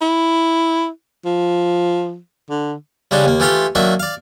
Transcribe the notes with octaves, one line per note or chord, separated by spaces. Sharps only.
E4
F3
D3
C#3 G3 G#3 D4 D#4
D#2 A#3
E3 A3 F4 G4 F5 C6
D#3 F#3 A#3 D4 E5
D5 F5